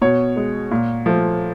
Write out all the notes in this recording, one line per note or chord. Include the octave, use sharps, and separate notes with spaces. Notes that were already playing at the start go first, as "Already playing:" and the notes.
B2 C#5
G#3
A#2
F3 A3